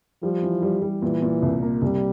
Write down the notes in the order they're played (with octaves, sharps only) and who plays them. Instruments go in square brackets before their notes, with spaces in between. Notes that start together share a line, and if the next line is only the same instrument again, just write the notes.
[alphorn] F3 [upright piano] G3
[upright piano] E3
G3
G3
[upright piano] A#2 [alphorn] E3
[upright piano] A#2
C2
A#3
[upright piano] C2 [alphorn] G3